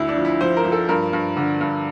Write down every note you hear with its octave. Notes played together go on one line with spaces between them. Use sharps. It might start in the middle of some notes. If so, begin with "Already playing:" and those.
Already playing: D2 E4
D4
F3
E4
F3 C5
A#4
F3
A4
G2 A#4
G2
D3
G2